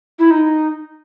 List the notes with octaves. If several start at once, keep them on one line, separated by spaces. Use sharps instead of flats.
E4
D#4